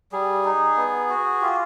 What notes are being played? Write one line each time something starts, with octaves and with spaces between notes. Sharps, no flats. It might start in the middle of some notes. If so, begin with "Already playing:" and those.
G3 G#4
D#4
B3
F#4
F4 G4
F#4